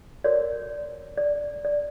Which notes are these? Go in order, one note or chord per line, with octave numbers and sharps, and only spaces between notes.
F#4 A#4 C#5 D5
D5
D5